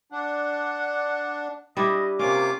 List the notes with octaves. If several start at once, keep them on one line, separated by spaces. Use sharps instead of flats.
D4 F#5
G3 D4 E4 D#5
C3 A#3 C#4 F4 D6